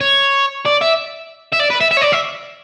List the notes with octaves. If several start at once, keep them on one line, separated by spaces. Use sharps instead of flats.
C#5
D5
E5
E5
D5
B4
E5
E5
C#5
D5
E5